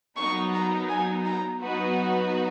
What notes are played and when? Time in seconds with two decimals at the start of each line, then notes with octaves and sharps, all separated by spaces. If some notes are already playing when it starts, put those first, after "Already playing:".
0.17 F#3 B3 D#4 A#4 C#6
0.54 A#5
0.89 G#5
1.26 A#5
1.61 F#3 B3 D#4 F#4 B4